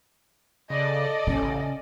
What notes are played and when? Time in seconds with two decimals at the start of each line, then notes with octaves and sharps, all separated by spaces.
0.70 C#3 A4 D5 D#5
1.27 A1 C#3 C#4